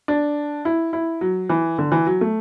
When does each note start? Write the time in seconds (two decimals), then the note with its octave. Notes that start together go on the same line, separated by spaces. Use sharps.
0.08 D4
0.65 E4
0.93 E4
1.21 F#3
1.49 E3
1.78 D3
1.92 E3
2.06 F#3
2.21 A3